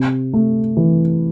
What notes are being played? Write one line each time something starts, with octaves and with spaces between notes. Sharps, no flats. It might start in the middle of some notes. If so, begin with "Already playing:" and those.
Already playing: C3
A3
E3